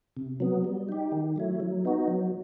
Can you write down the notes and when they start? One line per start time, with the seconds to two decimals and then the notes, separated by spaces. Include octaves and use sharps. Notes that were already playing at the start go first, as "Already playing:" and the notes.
0.17 C3
0.40 F#3 B3
0.64 G3
0.89 D#4 G4
1.12 D#3
1.36 F#3 A3 E4
1.60 F#3
1.85 B3 D#4 F#4
2.08 F#3